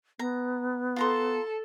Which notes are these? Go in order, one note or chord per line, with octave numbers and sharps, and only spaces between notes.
B3 A#5
F4 A4 A#5 C6